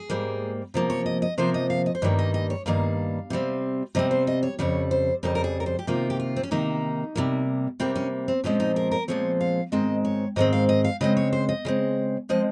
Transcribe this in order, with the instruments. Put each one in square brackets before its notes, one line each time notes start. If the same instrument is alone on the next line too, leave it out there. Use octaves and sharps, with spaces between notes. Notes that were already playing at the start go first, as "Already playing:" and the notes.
Already playing: [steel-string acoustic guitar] G#4
G#2 G3 A#3
C3 F3 A#3
C#5
D#5
D#5
C3 F3 A#3 C5
D#5
F5
D#5
C5
G2 D#3 G3 A#3 C#5
D#5
D#5
C#5
G2 D#3 G3 A#3 F5
C3 G3 C4
C3 G3 C4 D#5
C5
D#5
C#5
F2 C#3 G3 C#5
C5
F2 C#3 G3 A#4
A#4
G#4
A#4
C5
G4
C3 D#3 A#3 F4
G4
F4
C4
C#4
C3 D#3 A#3 D#4
C3 G3 A#3
C3 G3 A#3 C4
C#4
C4
A#2 F3 G#3 C4 C#4
D#4
A#4
A#4
A#2 F3 G#3 C4 C#5
F5
G#2 D#3 G#3 C4 D#5
C#5
G#2 D#3 G#3 C4 D#5
F5
D#5
F5
C#3 G#3 C4 D#5
C#5
C5
D#5
C#3 G#3 C4
F3 G#3 C4 D#5